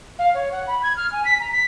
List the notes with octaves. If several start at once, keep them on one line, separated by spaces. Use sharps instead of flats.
F5
C#5
F#5
B5
G#6
F6
G#5
B6
A#5
B6